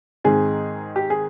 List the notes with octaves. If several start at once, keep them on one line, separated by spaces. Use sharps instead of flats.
G#2 D#3 G#3 C4 G#4
G4
G#4